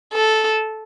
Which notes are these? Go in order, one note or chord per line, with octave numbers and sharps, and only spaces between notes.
A4